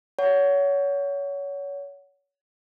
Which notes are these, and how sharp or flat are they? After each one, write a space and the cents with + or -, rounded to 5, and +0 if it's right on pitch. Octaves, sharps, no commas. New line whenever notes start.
C#5 +25 F#5 +0